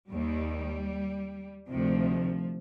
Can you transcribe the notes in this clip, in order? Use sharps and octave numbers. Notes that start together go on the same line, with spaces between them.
D#2 D#3 G3
D2 C3 D#3 F3